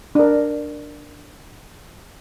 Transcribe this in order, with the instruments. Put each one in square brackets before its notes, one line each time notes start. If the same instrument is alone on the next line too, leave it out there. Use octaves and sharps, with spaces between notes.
[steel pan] D4 A#4